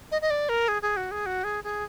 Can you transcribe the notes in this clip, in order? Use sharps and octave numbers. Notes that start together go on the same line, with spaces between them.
D#5
D#5
D5
A#4
G#4
G#4
F#4
G#4
F#4
G#4
G#4